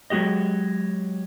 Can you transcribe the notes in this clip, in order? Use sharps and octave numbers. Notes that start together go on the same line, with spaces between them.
F#3 G#3 F#4 G4 D#5